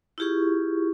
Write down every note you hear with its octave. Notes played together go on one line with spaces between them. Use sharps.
E4 F4 G4 G#4 C#6